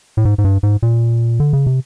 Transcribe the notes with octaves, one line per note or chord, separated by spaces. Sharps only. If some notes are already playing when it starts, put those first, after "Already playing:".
A2
G#2
G#2
G2
G#2
A#2
D3
C#3
C3